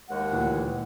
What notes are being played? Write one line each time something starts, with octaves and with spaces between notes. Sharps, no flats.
D#2 G#3 F#5
D2 A#2 E3